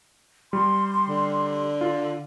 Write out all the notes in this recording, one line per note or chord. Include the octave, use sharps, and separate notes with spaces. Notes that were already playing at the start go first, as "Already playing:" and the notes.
G3 C6
D3
F4